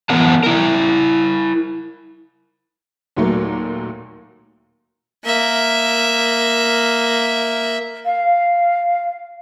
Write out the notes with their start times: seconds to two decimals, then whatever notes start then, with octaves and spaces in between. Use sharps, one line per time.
0.10 E3 B3 C4 A#4 F#5 A5
0.43 E4 A#4
3.16 D#2 A#2 F#3 A3 A#3
5.24 A#3 E5
8.06 F5